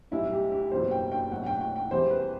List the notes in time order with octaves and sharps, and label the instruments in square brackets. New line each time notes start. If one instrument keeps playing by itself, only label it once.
[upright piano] B1 A2 G3 E4
G4
G4
F#1 E2 B2 F#3 B3 C5
G5
G5
B1 B2 F#3 A3 F#5
G5
G5
G5
E2 C3 E3 G3 C5
B4